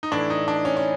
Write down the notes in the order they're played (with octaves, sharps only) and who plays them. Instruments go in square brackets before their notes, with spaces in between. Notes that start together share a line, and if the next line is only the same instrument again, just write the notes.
[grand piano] D#4
A2 E3 D4
D#4
D4
C#4
C#4